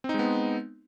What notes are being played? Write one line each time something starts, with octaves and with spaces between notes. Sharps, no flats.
G#3 B3 C4 D#4